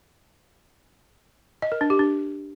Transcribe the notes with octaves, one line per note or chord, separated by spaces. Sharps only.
D#5
A#4
D4
G4
D4